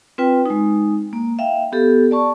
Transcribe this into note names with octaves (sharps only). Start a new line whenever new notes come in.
C4 F4 B4 G5
G#3 D#4
A#3
E5 F5 G5
B3 G4 A4
D5 A5 C#6